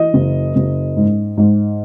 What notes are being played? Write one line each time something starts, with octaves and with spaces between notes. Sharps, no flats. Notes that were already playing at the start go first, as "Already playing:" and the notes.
Already playing: E3 D#5
F#1
F#1
G#2
G#2